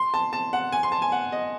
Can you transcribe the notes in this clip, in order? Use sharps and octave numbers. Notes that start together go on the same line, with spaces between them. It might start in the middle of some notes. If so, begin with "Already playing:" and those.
Already playing: C6
A5
A5
F#5
G#5
C6
A5
G#5
F#5
D#5